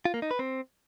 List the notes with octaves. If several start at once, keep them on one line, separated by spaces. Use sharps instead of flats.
F4
A#3
D#4
B4
C4